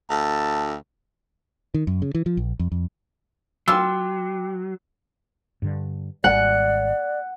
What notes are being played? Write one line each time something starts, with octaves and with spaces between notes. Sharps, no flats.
D2 A5
D#3
F#2
C#3
E3
F3
A#1
F2
F2
F#3 F4 G5 D6 E6
G2 D3
G#1 C#2 G3 D5 F#5